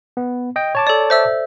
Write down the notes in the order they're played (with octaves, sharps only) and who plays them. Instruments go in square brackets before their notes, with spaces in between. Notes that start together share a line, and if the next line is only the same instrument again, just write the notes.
[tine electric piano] B3
D#5 G5
C#5 A5 D6
[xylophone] A4 D5
C5 E5 E6